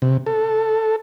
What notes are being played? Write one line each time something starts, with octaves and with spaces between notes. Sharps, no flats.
C3
A4